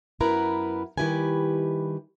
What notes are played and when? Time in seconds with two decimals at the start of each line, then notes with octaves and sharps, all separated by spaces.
0.20 F#2 B3 E4 A#4 B4 A#5
0.98 D#3 G3 E4 G4 B4 G#5